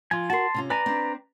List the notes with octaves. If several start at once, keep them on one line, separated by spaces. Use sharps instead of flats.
F3 F4 G#5
F#4 A#4 A5 C6
C3 C#4 F4
B4 D5 G#5 A#5
C4 D4